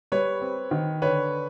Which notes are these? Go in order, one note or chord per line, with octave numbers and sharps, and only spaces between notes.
G3 B4 C#5
C4
D#3
D3 B4 C#5